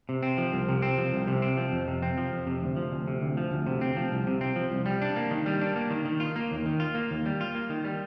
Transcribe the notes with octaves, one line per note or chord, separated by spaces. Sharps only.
C3
C4
F3
C2
C3
C4
F3
C2
C3
C4
F3
F2
C3
C4
F3
F2
C3
D2
F3
D2
C3
D2
F3
D2
C3
C4
F3
C2
C3
C4
F3
C2
G3
D4
A#3
D#3
G3
D4
A#3
D#3
D#3
F4
A#3
D#2
D#3
F4
A#3
D#2
G3
F4
A#3
D#3
G3